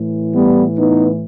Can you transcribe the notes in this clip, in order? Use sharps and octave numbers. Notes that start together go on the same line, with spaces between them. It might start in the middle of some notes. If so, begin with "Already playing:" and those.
Already playing: A2 E3
G3 B3
B3 D#4